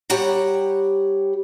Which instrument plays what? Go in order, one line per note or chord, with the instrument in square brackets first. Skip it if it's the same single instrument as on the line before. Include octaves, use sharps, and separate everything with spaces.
[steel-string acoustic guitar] G3 G4 C#5 F#5 A#5